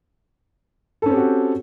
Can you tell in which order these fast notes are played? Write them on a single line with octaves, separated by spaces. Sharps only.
A4 C#4 C4 G4 F#4